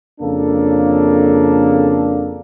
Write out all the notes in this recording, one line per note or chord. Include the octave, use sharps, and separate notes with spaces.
F2 C#3 A#3 D4 A4